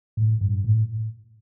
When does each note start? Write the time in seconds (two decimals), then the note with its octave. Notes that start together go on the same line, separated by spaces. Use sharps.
0.17 A2
0.41 G2
0.64 A2